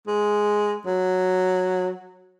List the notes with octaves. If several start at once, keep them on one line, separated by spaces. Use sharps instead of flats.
G#3
F#3